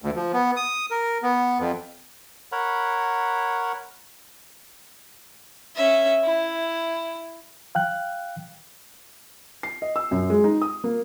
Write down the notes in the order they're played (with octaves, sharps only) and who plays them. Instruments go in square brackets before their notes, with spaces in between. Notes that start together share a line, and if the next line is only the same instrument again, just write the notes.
[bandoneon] D2
F3
B3
D#6
A#4
B3
F2
[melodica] A#4 C#5 F#5 B5
[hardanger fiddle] C#4 E5
E4
[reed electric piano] F5 G5 F#6
[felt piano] C7
D#5
E6
F#2
G#3
D#4
D#6
A#3